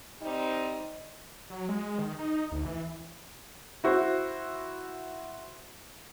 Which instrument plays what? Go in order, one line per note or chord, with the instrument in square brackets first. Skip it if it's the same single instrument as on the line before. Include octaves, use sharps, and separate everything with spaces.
[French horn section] G3 C4 D#4
[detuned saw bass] F#3
G#3
D#3
D#4
D2
E3
[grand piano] E4 F#4 C5